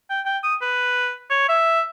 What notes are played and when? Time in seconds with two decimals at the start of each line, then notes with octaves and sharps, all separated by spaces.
0.10 G5
0.26 G5
0.43 D#6
0.62 B4
1.30 C#5
1.49 E5